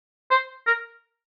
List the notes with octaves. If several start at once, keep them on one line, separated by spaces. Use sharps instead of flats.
C5
A#4